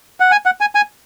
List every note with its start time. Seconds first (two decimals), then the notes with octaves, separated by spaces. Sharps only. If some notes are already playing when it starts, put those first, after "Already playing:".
0.20 F#5
0.32 G#5
0.46 F#5
0.61 G#5
0.75 G#5